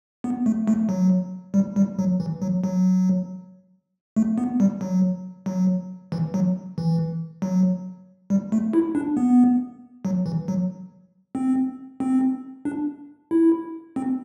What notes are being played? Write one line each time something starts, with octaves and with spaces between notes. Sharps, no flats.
B3
A3
A3
F#3
G3
G3
F#3
E3
F#3
F#3
A3
B3
G3
F#3
F#3
E3
F#3
E3
F#3
G3
A3
E4
D4
B3
F#3
E3
F#3
C4
C4
D4
E4
C4